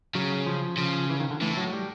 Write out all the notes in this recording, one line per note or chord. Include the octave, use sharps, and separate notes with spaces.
C#3 F#3
F3
C#3 F3
E3
D#3
D3
A2 E3
F#3
G3